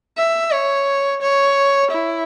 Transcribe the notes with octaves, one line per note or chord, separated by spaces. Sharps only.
E5
C#5
C#5
E4